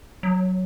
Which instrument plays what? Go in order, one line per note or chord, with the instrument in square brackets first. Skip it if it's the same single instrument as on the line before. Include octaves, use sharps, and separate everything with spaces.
[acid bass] F#3